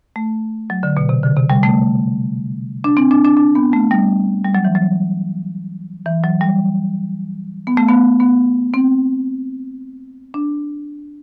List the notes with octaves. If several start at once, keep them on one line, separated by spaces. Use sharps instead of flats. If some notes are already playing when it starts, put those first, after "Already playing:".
A3
F#3
D3
B2
C3
D3
C3
G3
A3
D4
C4
D4
D4
D4
B3
A3
G3
G3
F#3
E3
F#3
E3
F#3
G3
B3
A3
B3
B3
C4
D4